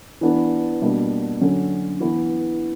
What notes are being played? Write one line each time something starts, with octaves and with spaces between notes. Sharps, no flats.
E3 B3 D4
B2 G3 A#3 D4
D3 F#3 C#4
E3 B3 E4